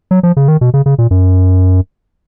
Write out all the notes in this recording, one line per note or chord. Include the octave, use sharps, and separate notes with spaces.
F#3
F3
C#3
D#3
B2
C#3
C#3
A#2
F#2